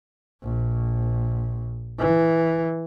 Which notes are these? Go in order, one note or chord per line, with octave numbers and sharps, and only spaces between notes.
A#1
E3